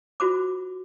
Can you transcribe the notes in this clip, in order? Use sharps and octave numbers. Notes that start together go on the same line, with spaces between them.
F4 F#4 C5 D6